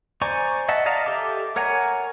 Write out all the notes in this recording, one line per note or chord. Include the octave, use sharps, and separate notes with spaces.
C5 D5 G#5 A#5 C#6
D#5 E5 F#5 A5
D5 D#5 F5 A5 A#5
G4 A4 E5 D6
A#4 C#5 F#5 G#5 A#5